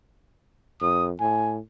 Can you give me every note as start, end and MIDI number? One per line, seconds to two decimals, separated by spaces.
0.82 1.13 41
0.82 1.05 87
1.20 1.58 45
1.20 1.56 80